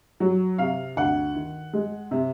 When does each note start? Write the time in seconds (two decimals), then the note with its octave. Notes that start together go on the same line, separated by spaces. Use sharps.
0.20 F#3
0.58 C3 F5
0.96 D2 F#5
1.35 D#3
1.73 G#3
2.11 C3